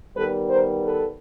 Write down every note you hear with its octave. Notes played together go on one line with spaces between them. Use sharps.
D#3 G3 B3 A4 B4
A#4 C5
A4 B4